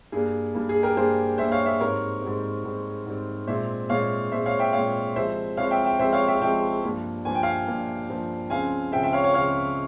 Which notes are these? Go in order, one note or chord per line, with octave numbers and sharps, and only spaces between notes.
G2 G3 A#3 G#4
G2 G3 A#3
G#4
G4 A#4
G2 G3 A#3 G#4 C5
G2 G3 A#3 C5 E5
C#5 F5
C5 E5
G#2 G3 C4 A#4 C#5
G#2 G3 C4
G#2 G3 C4
G#2 G3 C4
A#2 G#3 C4 C5 E5
A#2 G#3 C4 C#5 F5
A#2 G#3 C4 C5 E5
C#5 F5
E5 G5
A#2 G#3 C4 C#5 F5
C2 C3 F3 G#3 C4 C5 E5
C2 C3 F3 G#3 C4 C#5 F5
E5 G5
E5 G5
C2 C3 F3 G#3 C4 C5 E5
C#5 F5
E5 G5
C2 C3 F3 G#3 C4 E5 G5
G2 F3 A#3
G2 F3 A#3 G#5
G5
F5 G#5
G2 F3 A#3
G2 F3 A#3
C#2 C#3 F3 C4 F5 G#5
C#2 C#3 F3 C4 E5 G5
E5 G5
C#5 F5
C#5 F5
C#2 C#3 F3 C4 C#5 F5